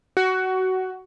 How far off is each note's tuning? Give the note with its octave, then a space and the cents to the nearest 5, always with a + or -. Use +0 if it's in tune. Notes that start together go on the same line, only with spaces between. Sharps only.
F#4 +15